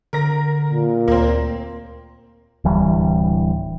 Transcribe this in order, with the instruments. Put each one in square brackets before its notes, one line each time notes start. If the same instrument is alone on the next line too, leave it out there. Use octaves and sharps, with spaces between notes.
[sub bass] D3 [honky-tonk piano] A#4 A#6
[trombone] A#2
[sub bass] D2 [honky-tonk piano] A#3 C4
[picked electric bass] D1 E3 G3